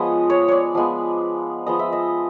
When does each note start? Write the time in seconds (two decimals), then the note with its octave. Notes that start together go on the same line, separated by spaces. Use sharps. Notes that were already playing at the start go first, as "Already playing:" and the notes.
Already playing: F3 G#3 B3 C#5 D#5
0.30 C#5
0.48 C#5 D5
0.75 F3 G#3 B3
1.66 F3 G#3 B3 D#5
1.79 E5
1.92 D#5